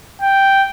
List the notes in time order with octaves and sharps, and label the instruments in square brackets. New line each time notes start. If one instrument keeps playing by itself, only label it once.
[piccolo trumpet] G5